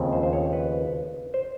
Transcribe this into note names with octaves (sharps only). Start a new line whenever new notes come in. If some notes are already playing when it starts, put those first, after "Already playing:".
Already playing: D#2 C#3 F3 A3 C4
C5
C5
C#5
B4
C5